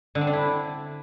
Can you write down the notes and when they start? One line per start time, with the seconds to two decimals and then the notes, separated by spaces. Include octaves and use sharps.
0.15 D3
0.21 C4
0.27 D4
0.33 E4